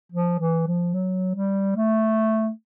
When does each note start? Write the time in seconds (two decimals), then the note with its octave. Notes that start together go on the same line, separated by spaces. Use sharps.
0.12 F3
0.40 E3
0.67 F3
0.94 F#3
1.35 G3
1.76 A3